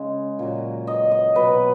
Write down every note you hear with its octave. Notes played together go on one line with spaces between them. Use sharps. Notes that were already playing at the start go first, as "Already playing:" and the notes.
Already playing: C#3 G#3
A#2 F#3
D#5
D#5
B2 F#3 B4